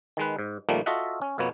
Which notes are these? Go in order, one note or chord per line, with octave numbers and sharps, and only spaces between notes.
D#3 G#3 B4
G#2
A#2 D#3 F3 G3 A3 A#3
F4 F#4 A4 D#5 E5 F#5
C#4
F2 B2 A#3 B3 C#5